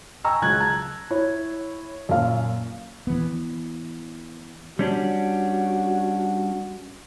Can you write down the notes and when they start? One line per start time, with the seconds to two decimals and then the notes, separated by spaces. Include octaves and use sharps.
0.24 D#5 G5 G#5 A#5 C#6 E6
0.42 C#2 F#3 F#6 G#6
0.60 A5 A#5 G#6 A6
1.11 E4 C#5
2.09 F#2 A#2 F5
3.07 E3 B3
4.79 G3 C#4 D4 F#4